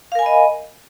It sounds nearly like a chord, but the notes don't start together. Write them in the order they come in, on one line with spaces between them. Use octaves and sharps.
F5 A#4 G#5 B5 D#5